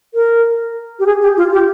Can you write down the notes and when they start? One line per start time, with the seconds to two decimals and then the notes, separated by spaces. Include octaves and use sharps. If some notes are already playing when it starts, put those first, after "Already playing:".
0.14 A#4
0.99 G4
1.06 G#4
1.21 G4
1.37 F4
1.52 G4